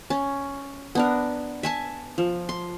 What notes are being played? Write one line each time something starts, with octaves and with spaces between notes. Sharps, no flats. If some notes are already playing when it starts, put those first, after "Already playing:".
C#4
B3 D4 A#4
E5 G#5 A5
F3
C6